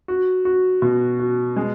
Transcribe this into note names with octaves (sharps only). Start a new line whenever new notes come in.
F#4
F#4
B2
F#4
G#3